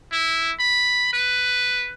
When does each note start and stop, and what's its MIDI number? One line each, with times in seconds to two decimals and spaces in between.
0.12 0.52 64
0.59 1.08 83
1.13 1.94 71